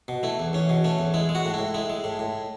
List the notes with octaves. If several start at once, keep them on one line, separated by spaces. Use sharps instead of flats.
B2
A3 E4
E2
E2 C#4
B2
A3 C#4
E2
G#3 E4
G#3
F#4
A2
E4
A2
G#3 E4
G#3
A2
A2